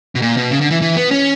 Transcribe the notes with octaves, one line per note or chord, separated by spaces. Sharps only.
B2
A#2
B2
C#3
D3
E3
E3
B3
C#4